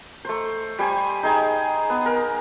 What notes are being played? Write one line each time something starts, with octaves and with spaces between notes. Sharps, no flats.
A3 C5
G3 C5 G#5
D#4 G#4 G5 G#5
B3
A#4